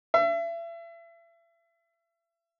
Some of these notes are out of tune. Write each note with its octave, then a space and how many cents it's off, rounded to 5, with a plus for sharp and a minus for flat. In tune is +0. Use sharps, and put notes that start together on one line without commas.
E5 +35